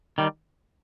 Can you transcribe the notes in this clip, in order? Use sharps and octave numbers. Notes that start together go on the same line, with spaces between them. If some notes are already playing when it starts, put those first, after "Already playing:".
D#3 G3